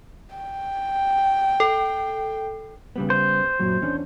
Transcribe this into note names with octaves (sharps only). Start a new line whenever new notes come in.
G5
A4
C#3 G3 B3
C5
F#2 A#2 F#3
E2 C#4 D4